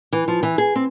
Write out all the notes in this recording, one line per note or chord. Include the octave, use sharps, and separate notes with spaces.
E3
F3
E3
G#4
C4